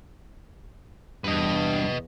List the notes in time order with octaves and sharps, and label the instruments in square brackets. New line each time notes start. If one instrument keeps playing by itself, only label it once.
[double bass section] E2 [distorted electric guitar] G2 [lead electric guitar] B4 D#5